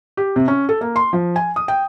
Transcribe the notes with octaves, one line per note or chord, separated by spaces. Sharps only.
G4
C3
C#4
A4
A#3
C6
F3
G#5
D#6
G5